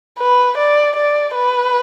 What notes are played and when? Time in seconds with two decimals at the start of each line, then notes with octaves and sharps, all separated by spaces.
0.19 B4
0.58 D5
0.96 D5
1.35 B4